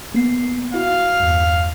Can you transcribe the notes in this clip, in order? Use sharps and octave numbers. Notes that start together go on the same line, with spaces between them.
A#3 B3 C7
E4 F#4 F5
E2 G2